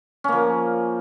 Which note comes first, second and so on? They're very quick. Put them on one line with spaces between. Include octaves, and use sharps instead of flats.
C#4 A#3 F3